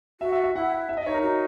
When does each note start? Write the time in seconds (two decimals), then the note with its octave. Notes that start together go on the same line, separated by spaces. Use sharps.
0.21 F#4 E5
0.32 E5
0.44 E5
0.55 E4 F#5
0.72 F#5
0.89 E5
0.97 D#5
1.06 D#4 C#5
1.14 A#4
1.22 D#4 F#4